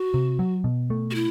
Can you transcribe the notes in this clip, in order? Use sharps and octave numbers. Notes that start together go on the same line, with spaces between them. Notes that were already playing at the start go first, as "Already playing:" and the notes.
Already playing: F#4
C3
F#3
B2
A3
F#4
E4